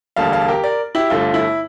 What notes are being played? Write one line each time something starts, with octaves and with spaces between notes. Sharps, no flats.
E1 D2 D3 G3 A#3 F5 A5
F5 A5
G4 A#4
A#4 D5
E4 G4
G1 G2 D3 A3 F4
E4